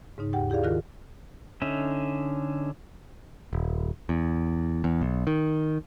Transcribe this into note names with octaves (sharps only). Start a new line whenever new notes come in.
G#2 C#3 D#4
D#2 G4 F#5 G5
E4 G4 G#4 D5 F5
D#3 F4 A#4 F#6
D3 C#4 D#4 E5
D#1
E2
E2
B1
D#3